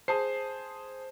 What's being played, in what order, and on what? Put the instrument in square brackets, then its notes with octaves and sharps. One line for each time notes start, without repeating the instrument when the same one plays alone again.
[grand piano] G#4 A5 C7 [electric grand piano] C5